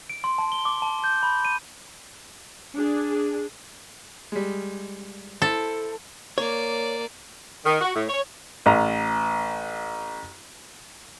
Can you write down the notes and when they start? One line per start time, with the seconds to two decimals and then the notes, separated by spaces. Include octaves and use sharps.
0.10 D7
0.24 C6
0.38 A5
0.52 G7
0.65 D6
0.82 A5
1.04 G6
1.23 B5
1.45 D#7
2.75 D4 G#4
4.32 G3 G#3
5.42 E4 A4 C5
6.38 A#3 C#5 D5
7.65 D#3
7.81 F#4
7.94 A2
8.09 C#5
8.66 A1 A#5